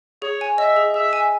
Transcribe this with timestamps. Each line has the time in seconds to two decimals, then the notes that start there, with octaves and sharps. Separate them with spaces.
0.22 G#4 C#5
0.41 G#5
0.58 D#5 E5
0.76 G#4
0.94 G#4 E5
1.13 G#5